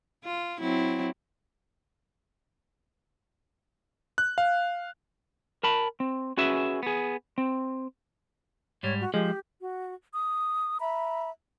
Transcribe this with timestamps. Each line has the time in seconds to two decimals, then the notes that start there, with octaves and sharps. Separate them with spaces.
0.24 F4
0.60 F#3 C4 E4
4.18 F#6
4.38 F5
5.63 A#4 A5 B5
6.00 C4
6.37 C#4 F#4 G#4 B4 E5
6.83 B3 G#4
7.38 C4
8.83 G#2 G3 C#5
9.01 F#4
9.14 F3 G#3 G4
9.60 F#4
10.12 D#6
10.79 E5 A#5 B5